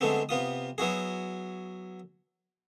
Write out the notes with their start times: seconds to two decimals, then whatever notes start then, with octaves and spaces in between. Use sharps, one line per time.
0.01 D3 G#3 A3 B3 C4
0.29 C3 B3 F4 D#6
0.78 F#3 B3 E4 F#4 G#4